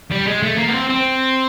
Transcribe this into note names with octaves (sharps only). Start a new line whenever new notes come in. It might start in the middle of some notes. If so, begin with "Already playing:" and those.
G3
G#3
A3
A#3
B3
C4
C4